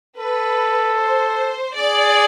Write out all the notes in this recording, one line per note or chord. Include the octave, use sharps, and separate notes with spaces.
A4 B4
C5
G#4 D5